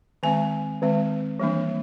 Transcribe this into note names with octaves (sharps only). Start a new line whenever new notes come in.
D#3 G#3 C4 G#5
D#3 G#3 C4
E3 G3 A#3 D4